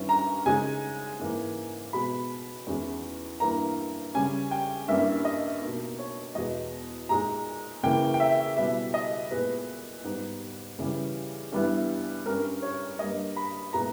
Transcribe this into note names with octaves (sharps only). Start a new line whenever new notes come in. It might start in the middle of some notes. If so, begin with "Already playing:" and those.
Already playing: G2 D#3 G3 C#4 E4
A#5
C#3 G#3 D#4 G#5
G#2 E3 A#3
B2 G#3 B3 B5
E2 D#3 G#3 C#4 E4
G2 E3 A#3 E4 A#5
C#3 G3 C#4 G#5
G5
G2 G3 A#3 C#4 E4 E5
D#5
B2 A#3 D#4
C#5
E2 B2 G#3 B3 D#5
A#2 G#3 D#4 A#5
C#3 E3 A#3 E4 G5
G5
E5
B2 G3 B3 E4 E5
D#5
A#2 G#3 B3 E4 B4
G#2 G3 B3 D#4
C#3 E3 G3
G2 E3 G3 B3 E4
G2 G3 C#4 A#4
C#5
G2 G3 A#3 D#5
B5
A#2 G#3 B3 E4 A#5